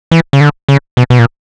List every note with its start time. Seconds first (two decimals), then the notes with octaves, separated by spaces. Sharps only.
0.11 E3
0.33 C#3
0.41 D3
0.69 C#3
0.97 B2
1.10 B2
1.19 A#2